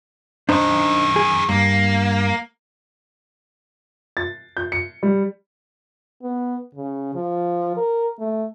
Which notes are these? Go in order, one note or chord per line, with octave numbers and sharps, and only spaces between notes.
F#2 D#3 D4 D#4 C5
G#4
G2 A#3
A6
G6
C#7
G3
B3
C#3
F3
A#4
A3